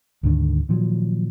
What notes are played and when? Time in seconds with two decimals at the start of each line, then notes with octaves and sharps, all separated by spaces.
0.23 D2 G#2 D3 D#3
0.69 A#2 D#3 F3 F#3